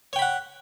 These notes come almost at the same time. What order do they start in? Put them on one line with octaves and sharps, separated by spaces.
C#5 G5 B5 F#5